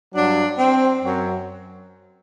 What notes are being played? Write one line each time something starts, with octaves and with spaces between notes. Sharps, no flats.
G2 F#3 D4
C4
F#2 F#3